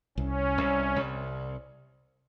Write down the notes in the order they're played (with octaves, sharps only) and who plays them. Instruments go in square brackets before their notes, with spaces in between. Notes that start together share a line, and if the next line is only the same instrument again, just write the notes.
[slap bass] C2 [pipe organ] C#4
[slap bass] C2
C2